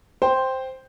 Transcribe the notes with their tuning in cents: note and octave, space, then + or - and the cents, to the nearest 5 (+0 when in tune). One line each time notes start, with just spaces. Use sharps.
C5 +0 G5 +0